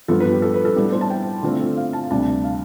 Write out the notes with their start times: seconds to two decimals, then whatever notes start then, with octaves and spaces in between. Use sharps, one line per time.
0.08 G2 F3 B3 A4
0.20 B4
0.32 G4
0.42 A4
0.54 B4
0.65 A4
0.76 A2 G3 B3 D4
0.92 C5
1.01 A5
1.10 G5
1.43 D3 A3 C4 F4
1.77 F5
1.93 A5
2.10 D2 C3 G3 D4 A5
2.44 F5